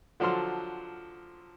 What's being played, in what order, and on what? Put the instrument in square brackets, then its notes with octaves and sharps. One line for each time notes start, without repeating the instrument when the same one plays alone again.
[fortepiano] D3 F3 F#3 A4 C6 F6